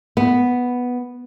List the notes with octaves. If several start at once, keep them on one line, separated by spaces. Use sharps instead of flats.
B3